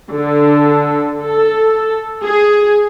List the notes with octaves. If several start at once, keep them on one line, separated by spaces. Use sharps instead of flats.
D3
A4
G#4